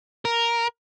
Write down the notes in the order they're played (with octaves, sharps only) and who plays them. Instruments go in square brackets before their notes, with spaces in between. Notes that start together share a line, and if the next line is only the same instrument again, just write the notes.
[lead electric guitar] A#4